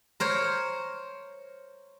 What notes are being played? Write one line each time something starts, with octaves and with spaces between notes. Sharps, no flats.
A#4 C5 C#5